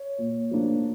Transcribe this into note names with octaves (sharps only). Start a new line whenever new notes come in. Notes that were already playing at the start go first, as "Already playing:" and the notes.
Already playing: C#5
A#2
F3 A#3 D4